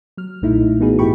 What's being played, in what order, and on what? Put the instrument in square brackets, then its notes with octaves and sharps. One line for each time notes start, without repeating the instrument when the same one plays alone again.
[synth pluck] F#3 F6
B1 A#2 A3 D#4 E4
E3 B3 D#4 F#4 G#4 B4
G#2 E4 G4 G5 B5 C#6